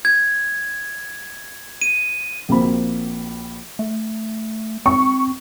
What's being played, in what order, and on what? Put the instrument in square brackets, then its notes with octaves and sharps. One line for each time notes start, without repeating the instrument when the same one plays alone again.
[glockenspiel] G#6
D#7
[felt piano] A#1 A#3 C4 F#4 B5
[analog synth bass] A3
[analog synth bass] C4 [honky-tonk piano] C#6